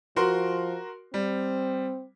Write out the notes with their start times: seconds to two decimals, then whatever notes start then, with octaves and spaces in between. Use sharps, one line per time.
0.16 F3 F#4 A#4 C6
1.14 G3 C4